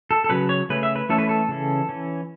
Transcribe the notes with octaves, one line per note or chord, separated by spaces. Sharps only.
A4
A4
C#3 F#3 C#4 B4
C#5
C#3 A3 C#4 B4
E5
B4
E3 A3 C#4 A4
B4
A4
C#3 E3 C#4
E3 C#4